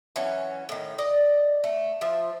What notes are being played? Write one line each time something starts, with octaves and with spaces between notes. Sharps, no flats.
E3 F#3 C#4
A2 D#3
D5 D#5
A3
F3 C5 E5